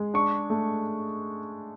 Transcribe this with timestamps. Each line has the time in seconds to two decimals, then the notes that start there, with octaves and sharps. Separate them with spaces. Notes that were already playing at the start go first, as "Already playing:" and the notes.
Already playing: G#3
0.14 D4 C#6
0.50 A3